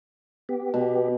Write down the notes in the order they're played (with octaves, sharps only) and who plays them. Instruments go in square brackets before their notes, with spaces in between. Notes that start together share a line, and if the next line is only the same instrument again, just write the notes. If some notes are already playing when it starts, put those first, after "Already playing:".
[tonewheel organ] B3 G4
[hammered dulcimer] B2